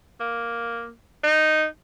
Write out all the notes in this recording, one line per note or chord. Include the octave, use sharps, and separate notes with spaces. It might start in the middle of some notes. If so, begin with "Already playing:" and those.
A#3
D#4